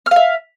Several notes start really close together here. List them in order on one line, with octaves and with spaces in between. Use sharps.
F6 F5 E5